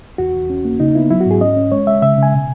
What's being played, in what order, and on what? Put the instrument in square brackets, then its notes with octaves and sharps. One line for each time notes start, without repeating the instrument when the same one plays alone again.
[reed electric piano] E2 F#4
E2
C#4
A#3
C#3 D#4
B3 E4
F#3 E4
F#4
G#2 G#4
C#4 D#5
C#4
G#3 C#5
G#3 E5
C#3 E5
C#3 G#5
B2